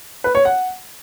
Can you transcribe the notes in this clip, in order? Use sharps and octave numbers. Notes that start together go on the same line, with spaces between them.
B4
C#5
F#5